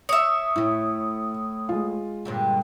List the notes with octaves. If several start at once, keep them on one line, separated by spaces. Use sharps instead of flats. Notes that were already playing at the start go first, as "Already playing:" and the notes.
C#5 E5 D#6
A2 A3 E4
G#3 F4
G2 A#2 D3